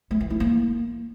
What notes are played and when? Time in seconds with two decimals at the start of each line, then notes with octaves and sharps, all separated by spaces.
0.11 A3
0.20 E3
0.30 E4
0.40 A#3